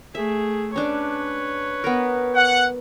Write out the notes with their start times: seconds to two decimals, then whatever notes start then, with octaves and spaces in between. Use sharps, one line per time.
0.15 A3 G#4 E5
0.76 C#4 D4 B4 C#5
1.84 B3 A#4
2.35 F#5